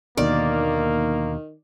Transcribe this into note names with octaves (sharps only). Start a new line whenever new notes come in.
D#2 B2 D3 D#3 A#3 D5